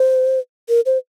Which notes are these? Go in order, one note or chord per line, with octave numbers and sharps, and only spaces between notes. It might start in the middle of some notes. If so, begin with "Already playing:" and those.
Already playing: C5
A#4
C5